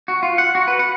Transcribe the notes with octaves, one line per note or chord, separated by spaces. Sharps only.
F#4
F4
F#5
F#4
B4
F#5